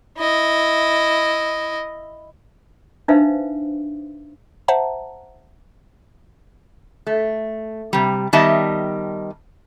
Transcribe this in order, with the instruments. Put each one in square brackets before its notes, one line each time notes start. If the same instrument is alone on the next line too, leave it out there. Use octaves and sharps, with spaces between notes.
[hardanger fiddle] E4 D#5
[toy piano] D4 D#4 B4 C5 E5 F5
[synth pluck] C5 E5 F#5 A5 A#5
[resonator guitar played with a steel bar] A3
C3 G3
D#3 G3 B3 D#5 E5 A5